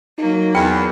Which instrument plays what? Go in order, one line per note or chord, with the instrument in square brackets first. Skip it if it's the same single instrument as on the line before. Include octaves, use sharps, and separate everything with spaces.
[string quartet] F#3 A#3 [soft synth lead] D#4
[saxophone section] E2 [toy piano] G5 [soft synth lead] B5